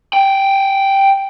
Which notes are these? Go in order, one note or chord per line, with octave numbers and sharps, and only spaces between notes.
F#5 G5